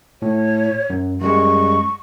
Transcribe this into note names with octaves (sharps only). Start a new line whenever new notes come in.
A2 C#5
F#2
F#2 G3 G#3 C#6